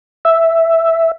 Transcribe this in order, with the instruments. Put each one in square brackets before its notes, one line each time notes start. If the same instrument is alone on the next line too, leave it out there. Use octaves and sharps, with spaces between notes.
[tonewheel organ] E5